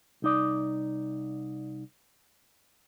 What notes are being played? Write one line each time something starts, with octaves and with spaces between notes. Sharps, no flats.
C2 D#4 D5